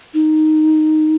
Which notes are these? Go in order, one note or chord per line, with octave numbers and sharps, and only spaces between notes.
D#4